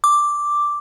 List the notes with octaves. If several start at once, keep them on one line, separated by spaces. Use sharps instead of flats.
D6